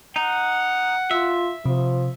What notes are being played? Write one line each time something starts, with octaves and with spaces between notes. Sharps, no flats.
D#4 F#5
F4 E5
C3 F3